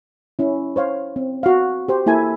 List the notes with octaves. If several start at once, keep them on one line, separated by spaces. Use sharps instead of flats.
C#4 E4
C5 C#5 F5
C4
F#4 F5
G4 C5
A#3 E4 A4 G#5